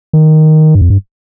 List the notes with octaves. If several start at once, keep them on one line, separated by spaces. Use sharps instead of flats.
D#3
G2
F2
G2